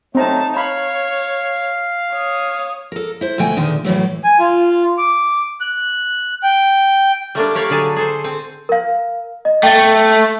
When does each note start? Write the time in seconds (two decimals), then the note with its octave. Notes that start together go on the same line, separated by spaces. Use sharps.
0.15 F#3 A3 C4 D#4 A5 A#5
0.57 C#5 F5 B5
2.12 C#5 D#6
2.92 A4 A#4
3.21 E4 C5
3.38 D2 B2 A3 G5 G#5
3.56 E2 A#2 D3 D#3
3.85 A2 E3 F#3 A3
4.24 G#5
4.40 F4
4.98 D6
5.61 F#6
6.43 G5
7.35 G3 A3 A#3 D4
7.55 A#3 G4 C#5 D5 F5
7.70 D3 F#3 G#4 A5
7.96 G#4 A4 C5
8.24 C4
8.69 A#4 F5
9.45 D#5
9.63 A3 G5 A6